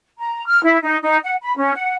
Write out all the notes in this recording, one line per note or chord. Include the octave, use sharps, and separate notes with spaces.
A#5
F6
E4
D#4
D#4
F#5
B5
C#4
F#5